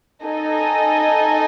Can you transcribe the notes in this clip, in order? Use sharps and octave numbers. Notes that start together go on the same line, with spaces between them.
D#4 A4 D#5 G#5